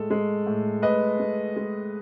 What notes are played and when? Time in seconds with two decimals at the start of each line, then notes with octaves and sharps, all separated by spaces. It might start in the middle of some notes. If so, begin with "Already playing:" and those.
Already playing: A2 G#3 A4
0.11 G#3
0.47 A2
0.82 A2 B4 D#5
1.20 G#3
1.57 G#3